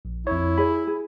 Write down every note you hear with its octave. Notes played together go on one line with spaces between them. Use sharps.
A#1
F2 E4 C#5
G#4 C#5 B5
G#4